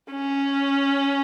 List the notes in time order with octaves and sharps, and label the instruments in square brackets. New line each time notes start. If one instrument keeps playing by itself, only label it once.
[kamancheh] C#4